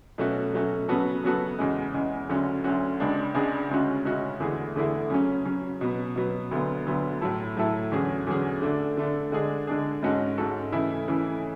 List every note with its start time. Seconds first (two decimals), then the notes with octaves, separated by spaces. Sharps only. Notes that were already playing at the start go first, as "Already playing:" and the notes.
0.18 B2 F#3 A3 C#4 F#4
0.53 B2 F#3 A3 C#4 F#4
0.88 C#3 F#3 B3 F#4 A4
1.24 C#3 F#3 B3 F#4 A4
1.59 E2 C#3 G#3
1.94 E2 C#3 G#3
2.29 D2 D3 F#3 C#4 F#4
2.64 D2 D3 F#3 C#4 F#4
3.00 C#2 C#3 G#3 D4 G#4
3.35 C#2 C#3 G#3 D4 G#4
3.70 D2 C#3 G#3 C#4 F#4
4.05 D2 C#3 G#3 C#4 F#4
4.40 E2 D3 A3 E4 G#4
4.75 E2 D3 A3 E4 G#4
5.10 C#3 F#3 C#4
5.45 C#3 F#3 C#4
5.81 B2 F#3 B3
6.16 B2 F#3 B3
6.51 D2 D3 F#3 B3
6.86 D2 D3 F#3 B3
7.21 A2 F#3 A3 E4 A4
7.57 A2 F#3 A3 E4 A4
7.92 E2 D3 F#3 C#4 G#4
8.27 E2 D3 F#3 C#4 G#4
8.62 D3 A3 D4
8.97 D3 A3 D4
9.32 D3 G#3 D4 G#4
9.67 D3 G#3 D4 G#4
10.03 G#2 G#3 C#4 F#4 A4
10.38 G#2 G#3 C#4 F#4 A4
10.72 C#3 E3 A3 E4
11.08 C#3 E3 A3 E4